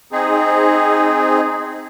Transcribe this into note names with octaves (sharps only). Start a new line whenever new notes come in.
C4 D#4 G#4